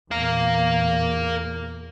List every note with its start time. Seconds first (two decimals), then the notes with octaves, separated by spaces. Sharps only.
0.11 E2 A#2 A#4 F5